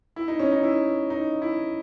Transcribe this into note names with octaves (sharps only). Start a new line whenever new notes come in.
E4
D#4
C#4
D#4
E4
D#4
E4